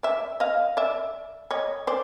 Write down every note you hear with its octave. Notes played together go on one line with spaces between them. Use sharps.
D5 E5
D#5 F5
D5 E5
C#5 D#5
C5 D5